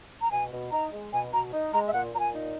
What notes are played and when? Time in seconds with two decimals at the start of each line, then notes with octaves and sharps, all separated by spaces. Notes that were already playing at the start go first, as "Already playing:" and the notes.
0.21 A#5
0.31 B2 G#5
0.52 B2
0.71 D#4 A#5
0.92 G#3
1.13 B2 G#5
1.33 B2 A#5
1.53 D#4
1.73 G#3 A#5
1.87 E5
1.93 A#2 F#5
2.14 A#2 A#5
2.20 G#5
2.34 D#4